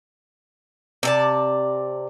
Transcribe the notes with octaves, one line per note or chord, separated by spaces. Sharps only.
C3 D5 A5